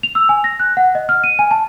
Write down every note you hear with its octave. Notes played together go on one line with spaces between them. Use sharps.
F7
E6
G#5
A#6
F#6
F#5
D#5
F6
D#7
G#5
A5